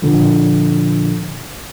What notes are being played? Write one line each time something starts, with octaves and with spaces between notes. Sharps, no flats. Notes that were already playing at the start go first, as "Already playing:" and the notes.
A#2 D3 F3